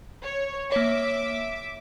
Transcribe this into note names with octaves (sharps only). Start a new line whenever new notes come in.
C#5
A#3 C#5 E5 D6